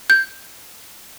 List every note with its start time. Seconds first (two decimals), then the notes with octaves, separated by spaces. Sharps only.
0.10 G6